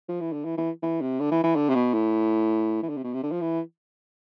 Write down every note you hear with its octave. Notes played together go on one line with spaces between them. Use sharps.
F3
E3
D3
E3
E3
E3
C3
D3
E3
E3
D3
C3
B2
A2
E3
D3
C3
B2
C3
D3
F3
E3